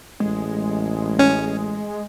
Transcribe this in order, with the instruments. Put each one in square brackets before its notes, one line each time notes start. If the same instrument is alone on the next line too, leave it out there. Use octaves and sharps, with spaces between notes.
[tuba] A1 [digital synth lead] G#3
[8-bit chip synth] C#4